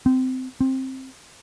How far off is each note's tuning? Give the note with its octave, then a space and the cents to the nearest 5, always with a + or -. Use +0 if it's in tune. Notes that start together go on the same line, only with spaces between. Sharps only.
C4 -20
C4 +15